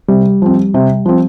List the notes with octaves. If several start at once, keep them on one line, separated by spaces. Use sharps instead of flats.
C3 G3
F3 C4
C3
F3 C4